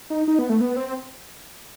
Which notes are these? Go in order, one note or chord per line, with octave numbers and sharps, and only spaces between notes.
D#4
D#4
B3
A3
B3
C4